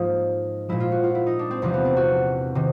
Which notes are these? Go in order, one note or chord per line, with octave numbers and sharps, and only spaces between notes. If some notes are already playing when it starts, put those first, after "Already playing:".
Already playing: G#2 F3 A#3 D#4
A#2 F3 G#3 E4
F4
F#4
F4
E4
D#4
D4
C4
E2 C3 F3 C4
B3
C4
F#4
C3 D#3